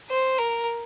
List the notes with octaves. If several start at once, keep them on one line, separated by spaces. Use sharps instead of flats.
C5
A#4